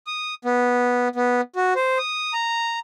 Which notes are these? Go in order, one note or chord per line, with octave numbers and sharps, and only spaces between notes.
D#6
B3
B3
F#4
C5
D#6
A#5